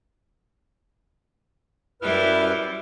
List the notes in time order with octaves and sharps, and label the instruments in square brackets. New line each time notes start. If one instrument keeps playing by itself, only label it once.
[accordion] F#2 B4 F6 [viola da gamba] G3 E4